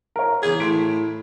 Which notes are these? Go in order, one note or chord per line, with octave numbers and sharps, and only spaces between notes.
A#4 C#5
E3 G#4 G#6
A2 C6 B6 D7